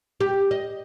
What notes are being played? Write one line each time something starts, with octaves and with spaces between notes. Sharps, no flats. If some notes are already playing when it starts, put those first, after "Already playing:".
G4
D#5